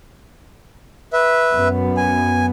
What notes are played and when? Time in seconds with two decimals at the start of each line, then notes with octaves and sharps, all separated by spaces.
1.13 B4 E5
1.51 F#2 B3
1.97 G#5